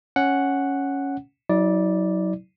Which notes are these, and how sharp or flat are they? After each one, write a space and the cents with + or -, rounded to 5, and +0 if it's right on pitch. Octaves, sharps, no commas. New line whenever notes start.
C#4 +0 F#5 +0
F#3 +0 E4 -45 D5 +0